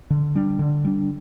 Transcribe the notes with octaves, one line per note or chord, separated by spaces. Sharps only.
D3
G3 D4
D3
G3 D4